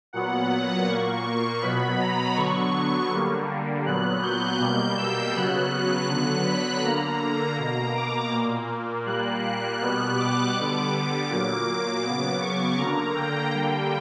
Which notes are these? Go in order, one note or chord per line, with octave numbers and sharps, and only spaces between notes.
A#2 F#3 B3 F#5
A#2 A#3 C#6
C#6
B2 F#3 B3 B5
A#5
D3 F#3 B3 C#6
D3 G3 A#3
A#2 F#3 B3 F#6
G6
B2 G3 A#3
E6
C#3 F#3 B3 F#6
D3 F#3 B3 F#6
B5
D3 A#3 A#5
B2 A#3 A#5
D6
A#2 A#3
A#2 G3 A#3 F#6
F#6
B2 G3 B3
D6
D3 G3 B3
D6
A#2 F#3 A#3 D6
C#3 F#3 B3
C#6
D3 A#3 A#5
G5
D3 G3 A#3